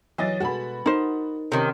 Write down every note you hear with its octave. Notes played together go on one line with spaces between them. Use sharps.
E3 F#3 D#5 F5 A6
B2 G#3 F#4 A4 B5
D#4 A#4 C5
C3 D#3 C#4